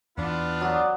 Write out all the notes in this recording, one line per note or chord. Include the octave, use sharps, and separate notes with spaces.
E2 B3 D4 F4
F#3 F#4 D5 D6 D#6